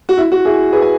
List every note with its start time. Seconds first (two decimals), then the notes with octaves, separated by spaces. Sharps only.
0.09 F#4
0.17 E4
0.32 F#4
0.45 E4 G#4
0.73 G#4 B4
0.82 G#5